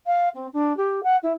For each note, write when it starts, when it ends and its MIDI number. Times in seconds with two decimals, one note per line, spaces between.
0.06 0.28 77
0.34 0.46 60
0.53 0.75 62
0.76 1.00 67
1.03 1.16 78
1.22 1.32 64